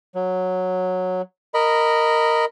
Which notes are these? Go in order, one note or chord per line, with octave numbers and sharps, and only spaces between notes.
F#3
A#4 D#5 B5